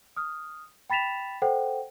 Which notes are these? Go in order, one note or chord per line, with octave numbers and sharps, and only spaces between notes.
D#6 F6
G5 B5 A6 B6 E7 F7
A4 C5 F#5 G5